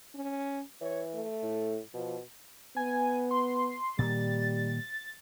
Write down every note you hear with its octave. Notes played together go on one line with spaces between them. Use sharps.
C#4
E3 C#5
A3
A2
B2 F3
B3 G#5
C6
A#2 D#3 G3 A#3 A6